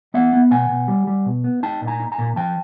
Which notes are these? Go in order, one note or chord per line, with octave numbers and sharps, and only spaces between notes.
B3 E5 F#5
B3
B2 F#5 G#5
B2
G3
G3
B2
B3
D#4 G5 A5
A#2
G#5 A#5
D#4
G#5 A#5
A#2
F3 G5 A5